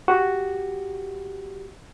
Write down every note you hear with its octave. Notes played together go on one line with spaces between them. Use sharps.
F#4 G4